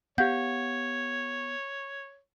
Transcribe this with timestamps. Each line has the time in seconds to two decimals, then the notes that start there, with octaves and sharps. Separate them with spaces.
0.18 B3 G4 C#5 F5 F#5 G6